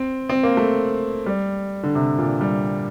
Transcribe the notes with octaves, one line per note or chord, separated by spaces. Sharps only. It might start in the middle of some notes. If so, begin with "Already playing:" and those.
Already playing: C4
C4
A#3
A3
G3
D3
C3
A#2
G3